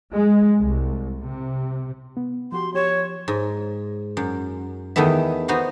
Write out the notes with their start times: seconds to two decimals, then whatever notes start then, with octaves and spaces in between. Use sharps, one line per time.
0.13 G#3
0.57 C2
1.22 C3
2.17 B3
2.52 F3 F#4 G4 C6
2.74 F3 G4 C#5 E7
3.28 G#2
4.17 F#2
4.96 E2 D#3 A3 B3 E5
5.48 B3 D#4 F#4 C5